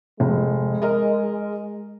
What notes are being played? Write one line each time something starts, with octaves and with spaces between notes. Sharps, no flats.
F1 G#3
A#4 D#5